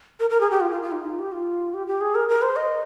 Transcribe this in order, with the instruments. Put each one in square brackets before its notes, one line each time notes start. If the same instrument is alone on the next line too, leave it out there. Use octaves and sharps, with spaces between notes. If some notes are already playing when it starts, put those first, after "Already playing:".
[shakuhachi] A#4
A#4
G#4
G4
F4
F4
F4
D#4
F4
G4
F4
G4
G4
G#4
A#4
A#4
C5
D#5